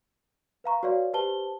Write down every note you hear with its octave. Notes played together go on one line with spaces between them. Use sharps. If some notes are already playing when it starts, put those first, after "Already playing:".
B4 F5 A#5 C#6
F#4 B4 C#5 D5 F5
G4 B4 C5 A5 G7